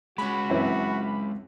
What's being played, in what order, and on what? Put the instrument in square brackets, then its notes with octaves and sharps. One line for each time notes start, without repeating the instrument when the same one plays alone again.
[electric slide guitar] G#3 C#4 [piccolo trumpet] F#4 [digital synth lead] B5
[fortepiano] F#2 E3 C4